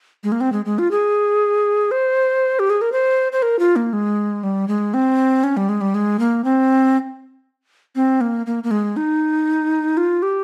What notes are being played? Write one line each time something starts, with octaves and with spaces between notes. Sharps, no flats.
G#3
A#3
C4
G#3
G#3
F4
G#4
C5
G4
G#4
A#4
C5
C5
A#4
F4
A#3
G#3
G3
G#3
C4
C#4
G3
G#3
G3
G#3
A#3
C4
C4
A#3
A#3
A#3
G#3
D#4
F4
G4